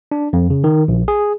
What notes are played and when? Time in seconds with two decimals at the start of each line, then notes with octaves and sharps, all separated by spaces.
0.11 D4
0.33 F2
0.50 C#3
0.64 D#3
0.88 A#1
1.08 G#4